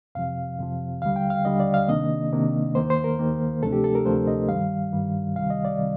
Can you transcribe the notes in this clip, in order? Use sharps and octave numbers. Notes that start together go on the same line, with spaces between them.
F2 C3 F3 F5
F2 C3 F3
D#2 D3 G3 F5
G5
F5
D#2 D3 G3 D#5
D5
F5
C3 D#3 A#3 D4 D#5
C3 D#3 A#3 D4
D#2 D#3 A#3 C5
C5
A#4
D#2 D#3 A#3
D2 C3 F3 A3 D4 A4
G4
A4
A#4
D2 C3 F3 A3 D4 C5
D#5
G2 D#3 G3 F5
G2 D#3 G3
C2 C3 D#3 G3 F5
D#5
D5
C3 D#3 G3